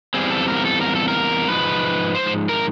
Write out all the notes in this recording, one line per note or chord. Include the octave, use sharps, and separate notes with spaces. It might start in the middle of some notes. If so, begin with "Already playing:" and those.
E2 B2 G3 C4 G#4
A4
A#4
A4
A#4
A4
A#4
G#2 F3 G#3 B4
C5
A#4